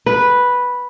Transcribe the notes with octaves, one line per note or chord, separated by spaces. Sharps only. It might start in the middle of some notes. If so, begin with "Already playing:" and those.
B4